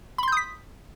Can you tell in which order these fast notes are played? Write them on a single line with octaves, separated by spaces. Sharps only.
B5 C6 G6 D#6 B6